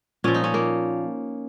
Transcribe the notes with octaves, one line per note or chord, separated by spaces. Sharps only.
A#2 F3 C#4
D#4
C#4
A#3